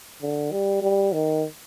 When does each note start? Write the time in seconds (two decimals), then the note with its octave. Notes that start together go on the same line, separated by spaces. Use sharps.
0.22 D3
0.52 G3
0.82 G3
1.13 D#3